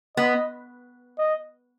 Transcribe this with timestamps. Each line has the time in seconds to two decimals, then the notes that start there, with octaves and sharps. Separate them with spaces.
0.17 B3 D#5
1.19 D#5